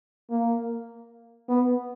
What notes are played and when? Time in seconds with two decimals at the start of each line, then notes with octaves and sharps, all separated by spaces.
0.31 A#3
1.49 B3